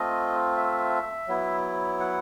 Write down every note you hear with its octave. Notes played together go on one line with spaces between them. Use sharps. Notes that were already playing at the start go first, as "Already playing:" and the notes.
Already playing: A3 C4 F4 D#5
E5
F#3 B3 E4
F#5